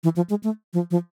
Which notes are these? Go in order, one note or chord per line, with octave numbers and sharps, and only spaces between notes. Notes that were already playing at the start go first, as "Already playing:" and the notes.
E3
F3
G#3
A3
F3
F3